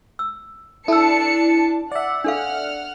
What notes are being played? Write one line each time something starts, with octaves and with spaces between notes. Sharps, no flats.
E6
D4 E4 A4 A5 E6 C#7
D5 E5 F#5
D4 A4 F5 F#5 F6